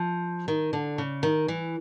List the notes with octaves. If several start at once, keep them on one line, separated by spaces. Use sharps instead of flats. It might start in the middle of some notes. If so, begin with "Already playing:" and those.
Already playing: F3
D#3
D3
C#3
D#3
E3